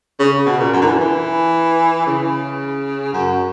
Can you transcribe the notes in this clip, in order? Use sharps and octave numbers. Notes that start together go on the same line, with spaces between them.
C#3
B2
A#2
F#2
D3
E3
E3
C#3
F#2